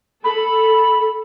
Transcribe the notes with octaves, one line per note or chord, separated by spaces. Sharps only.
A4 B5